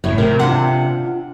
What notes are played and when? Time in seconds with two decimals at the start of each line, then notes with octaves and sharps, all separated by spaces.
0.04 F#1 A2 C#5
0.18 C3 A#4
0.39 D4 F4 F#5